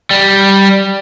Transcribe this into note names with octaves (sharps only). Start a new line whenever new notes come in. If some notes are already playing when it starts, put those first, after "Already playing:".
G3